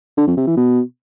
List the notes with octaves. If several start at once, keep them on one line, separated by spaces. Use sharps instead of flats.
D3
F2
C3
E3
B2